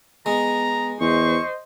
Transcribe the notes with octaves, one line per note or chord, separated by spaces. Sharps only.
G#3 B3 A#5
E2 C5 D#5 C#6